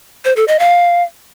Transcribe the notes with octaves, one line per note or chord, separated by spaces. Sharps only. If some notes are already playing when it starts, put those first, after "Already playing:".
C5
A4
D#5
F5